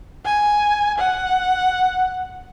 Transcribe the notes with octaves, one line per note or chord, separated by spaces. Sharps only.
G#5
F#5